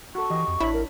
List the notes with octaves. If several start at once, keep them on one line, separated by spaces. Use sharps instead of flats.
F#4 A4 C#6
E3 G4 D#5
F2
A1 D4 E4 C#5 B5
A#4